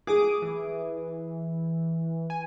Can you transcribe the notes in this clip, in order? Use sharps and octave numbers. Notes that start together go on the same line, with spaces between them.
G#4 D6 D#6 D7
E3
G#5